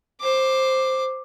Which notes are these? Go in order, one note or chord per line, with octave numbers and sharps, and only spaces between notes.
C5 D6